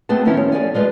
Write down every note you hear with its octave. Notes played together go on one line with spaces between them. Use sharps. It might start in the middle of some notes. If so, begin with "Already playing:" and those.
A3 B3 C4 G#4 B4 A5
D#3 F3 B3 C#4 E4
C#5
G#4 A#4 D5 G#5
F3 G#3 F4 B4 D5